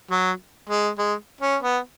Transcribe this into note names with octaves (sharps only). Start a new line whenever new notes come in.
F#3
G#3
G#3
C#4
B3